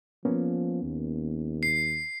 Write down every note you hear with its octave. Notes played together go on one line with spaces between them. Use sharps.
F3 A#3 B3 C#4
D#2
C7